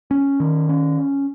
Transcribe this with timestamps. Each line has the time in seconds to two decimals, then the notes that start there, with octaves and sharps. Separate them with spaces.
0.11 C#4
0.40 D#3
0.69 C#4